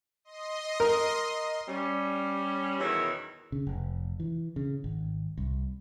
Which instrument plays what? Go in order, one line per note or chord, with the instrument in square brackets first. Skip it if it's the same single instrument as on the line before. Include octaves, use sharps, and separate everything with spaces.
[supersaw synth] D#5 C6
[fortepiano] A#4
[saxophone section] G3 C#4
E2 B2 D#3 F#4 C#5 E5
[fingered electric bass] C#3
F1
E3
C#3
G#1
C2